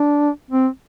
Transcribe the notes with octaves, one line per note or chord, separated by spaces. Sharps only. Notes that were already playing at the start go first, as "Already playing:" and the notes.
Already playing: D4
C4